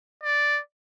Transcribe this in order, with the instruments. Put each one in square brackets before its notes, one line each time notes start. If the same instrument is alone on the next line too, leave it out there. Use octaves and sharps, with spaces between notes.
[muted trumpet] D5